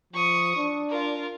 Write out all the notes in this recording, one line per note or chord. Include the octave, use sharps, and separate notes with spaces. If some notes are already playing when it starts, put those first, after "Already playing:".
F3 C#6 D#6
D4
F4 A#4